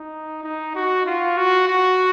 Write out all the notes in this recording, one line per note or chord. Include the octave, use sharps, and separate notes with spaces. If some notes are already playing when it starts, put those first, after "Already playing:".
Already playing: D#4
D#4
F#4
F4
F#4
F#4